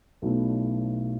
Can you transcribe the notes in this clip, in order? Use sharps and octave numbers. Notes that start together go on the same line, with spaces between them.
B1 B2 F#3 A3 E4